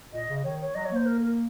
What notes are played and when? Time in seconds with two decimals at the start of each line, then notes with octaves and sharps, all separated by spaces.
0.13 A#2 D#5
0.29 C#3
0.44 D#3 C#5
0.61 C#5
0.75 F#3 D#5
0.85 C#5
0.91 A#3 C5
1.06 A#4
1.21 A#4